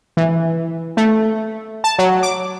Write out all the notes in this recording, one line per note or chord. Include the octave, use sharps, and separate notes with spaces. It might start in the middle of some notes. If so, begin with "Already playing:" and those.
E3
A3
A5
F#3
D6